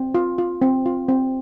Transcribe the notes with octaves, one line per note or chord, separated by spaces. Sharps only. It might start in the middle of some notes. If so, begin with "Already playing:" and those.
Already playing: C4
F4
F4
C4
F4
C4